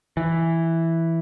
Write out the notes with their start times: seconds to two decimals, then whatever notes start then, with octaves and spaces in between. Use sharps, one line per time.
0.17 E3